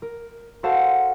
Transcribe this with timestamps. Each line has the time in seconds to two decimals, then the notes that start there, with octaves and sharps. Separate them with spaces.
0.02 A#4
0.63 F#4 A4 C5 F5 F#5 A5